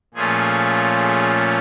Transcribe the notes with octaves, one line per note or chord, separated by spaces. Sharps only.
A#2 F3 A3 C#4 F4 G#4
G#4